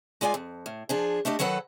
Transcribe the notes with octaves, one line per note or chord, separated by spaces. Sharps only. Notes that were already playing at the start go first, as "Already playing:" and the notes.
G#3 F4 D5 E5 G#5
F2
A2
F3 D4 G#4
A3 D4 G4 D#5
D#3 F#3 A4 B4 F#5